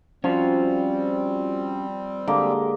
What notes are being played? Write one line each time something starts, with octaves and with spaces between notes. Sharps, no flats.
F3 G3 C4 C#4 F4 F#4
D3 G#3 A#3 G4